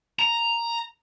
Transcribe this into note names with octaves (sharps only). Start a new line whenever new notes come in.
A#5